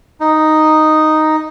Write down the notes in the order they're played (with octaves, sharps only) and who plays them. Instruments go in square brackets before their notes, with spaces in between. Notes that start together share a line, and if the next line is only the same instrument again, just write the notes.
[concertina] D#4